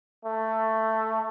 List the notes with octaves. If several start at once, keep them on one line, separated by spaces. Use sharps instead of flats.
A3